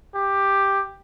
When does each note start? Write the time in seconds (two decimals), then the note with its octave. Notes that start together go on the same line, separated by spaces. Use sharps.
0.15 G4